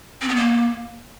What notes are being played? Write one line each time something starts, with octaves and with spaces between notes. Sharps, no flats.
C4
B3
A#3